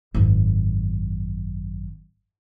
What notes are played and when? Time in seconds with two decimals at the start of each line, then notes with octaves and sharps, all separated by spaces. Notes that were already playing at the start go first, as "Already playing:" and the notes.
0.14 G#1 F#2